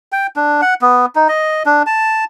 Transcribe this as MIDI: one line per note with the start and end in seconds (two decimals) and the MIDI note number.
0.12 0.27 79
0.36 0.61 62
0.62 0.74 78
0.82 1.06 59
1.16 1.28 63
1.29 1.63 75
1.66 1.83 62
1.87 2.24 81